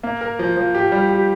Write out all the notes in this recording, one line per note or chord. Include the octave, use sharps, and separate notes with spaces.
A#3
A#4
F3
F3
G4
G3
G4